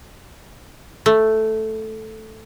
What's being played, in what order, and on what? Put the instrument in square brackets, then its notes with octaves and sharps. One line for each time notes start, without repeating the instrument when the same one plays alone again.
[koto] A3